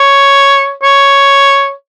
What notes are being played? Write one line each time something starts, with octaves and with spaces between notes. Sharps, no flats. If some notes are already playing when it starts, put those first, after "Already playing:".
Already playing: C#5
C#5